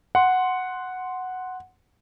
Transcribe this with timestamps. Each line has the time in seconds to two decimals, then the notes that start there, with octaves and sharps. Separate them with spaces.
0.15 F#5 C6